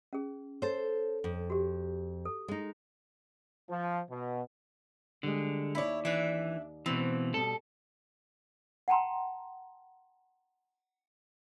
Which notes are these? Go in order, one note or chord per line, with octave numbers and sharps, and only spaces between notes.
C#4 G#4
A4 C5 C#5
F2
F#4 G4
A4
G#3 D#4
F3
B2
D3 G3 G#3
D#2 E4 C#5 D5
E3 D4 E5
B2 E3 C4
B2 G3 A4 A5
F#5 G5 A5 A#5 C6